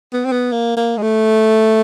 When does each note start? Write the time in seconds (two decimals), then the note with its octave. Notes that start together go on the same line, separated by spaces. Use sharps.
0.13 B3
0.25 C4
0.32 B3
0.52 A#3
0.77 A#3
0.97 G#3
1.02 A3